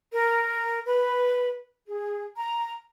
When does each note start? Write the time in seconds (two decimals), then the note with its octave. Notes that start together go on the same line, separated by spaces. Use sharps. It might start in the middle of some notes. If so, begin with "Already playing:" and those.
0.13 A#4
0.86 B4
1.86 G#4
2.36 A#5